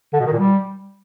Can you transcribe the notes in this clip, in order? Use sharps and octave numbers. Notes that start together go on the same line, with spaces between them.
D3
B2
D#3
A#2
G3